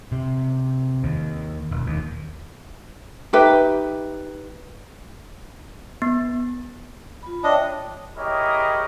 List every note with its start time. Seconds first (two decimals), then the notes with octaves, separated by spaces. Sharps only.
0.12 C3
1.04 D#2
1.71 E1
1.87 D#2
3.33 D#4 G4 B4 E5
6.02 B3
7.23 F4 B5
7.44 D4 C#5 D#5 E5 G5
8.17 E4 G4 G#4 A#4 C#5 D#5